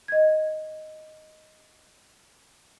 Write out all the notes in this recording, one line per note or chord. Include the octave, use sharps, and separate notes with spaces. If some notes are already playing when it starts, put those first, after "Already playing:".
D#5 G#6